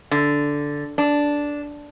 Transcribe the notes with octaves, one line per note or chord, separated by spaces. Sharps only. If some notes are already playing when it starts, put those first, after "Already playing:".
D3
D4